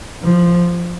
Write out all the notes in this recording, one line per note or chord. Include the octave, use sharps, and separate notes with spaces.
F3